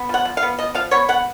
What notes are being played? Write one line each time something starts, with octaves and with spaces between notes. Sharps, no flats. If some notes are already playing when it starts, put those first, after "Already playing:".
Already playing: B3
F3 F#5
F3
F5
B3
F3 D#5
F3 F5
B3 C#5
B3 F#5